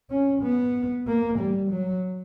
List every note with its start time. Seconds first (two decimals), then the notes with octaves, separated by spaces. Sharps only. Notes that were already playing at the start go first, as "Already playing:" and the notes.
0.10 C#4
0.42 B3
1.07 A#3
1.39 G3
1.71 F#3